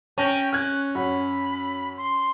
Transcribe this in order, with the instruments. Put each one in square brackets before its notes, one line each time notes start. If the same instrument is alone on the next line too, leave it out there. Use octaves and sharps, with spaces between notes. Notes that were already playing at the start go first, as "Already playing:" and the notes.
[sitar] C#4 [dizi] G5 [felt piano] A5 A#6
[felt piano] F6 G#6 [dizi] F#6
[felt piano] F#2 F#5 [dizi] B5
[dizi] C6